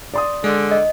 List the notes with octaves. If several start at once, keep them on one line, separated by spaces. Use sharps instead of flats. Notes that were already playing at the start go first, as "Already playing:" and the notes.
D5 C6 D#6
D3 G#3
D#5